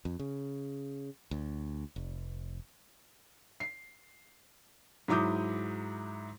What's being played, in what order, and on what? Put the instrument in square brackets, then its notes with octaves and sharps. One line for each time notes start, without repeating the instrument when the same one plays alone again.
[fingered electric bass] F2
C#3
D2
F1
[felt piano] C7
G#2 F#3 E4 D6 D#6 G6